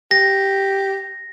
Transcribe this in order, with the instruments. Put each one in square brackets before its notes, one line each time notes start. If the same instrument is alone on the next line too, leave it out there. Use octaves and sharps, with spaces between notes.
[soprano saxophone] G4 [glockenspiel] A#6